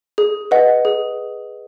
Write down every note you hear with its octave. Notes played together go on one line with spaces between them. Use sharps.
G#4
B4 D#5 F#5
G#4